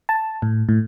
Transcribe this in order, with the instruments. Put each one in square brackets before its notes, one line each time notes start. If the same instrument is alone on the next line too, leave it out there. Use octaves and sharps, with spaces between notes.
[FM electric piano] A5
A2
A2